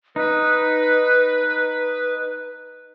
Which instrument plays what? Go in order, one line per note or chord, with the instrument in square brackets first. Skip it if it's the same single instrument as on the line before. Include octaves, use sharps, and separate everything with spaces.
[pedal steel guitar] D#4 [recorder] B4